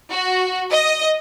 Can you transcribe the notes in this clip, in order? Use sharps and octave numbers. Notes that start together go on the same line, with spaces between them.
F#4
D#5